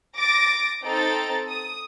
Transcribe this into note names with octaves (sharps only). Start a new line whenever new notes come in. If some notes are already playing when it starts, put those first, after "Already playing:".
D6 A6 A#6
C4 D#4 A4 A#5 A6
D#6